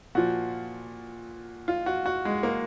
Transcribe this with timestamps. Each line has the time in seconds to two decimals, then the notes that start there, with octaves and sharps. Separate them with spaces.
0.15 A#2 F3 F#4
1.68 F4
1.86 F#4
2.06 F#4
2.25 G#3
2.43 A#3